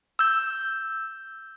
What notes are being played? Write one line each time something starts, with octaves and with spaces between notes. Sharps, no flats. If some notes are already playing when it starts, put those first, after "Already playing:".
E6 G6